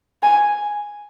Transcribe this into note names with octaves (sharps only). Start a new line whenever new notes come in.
G#5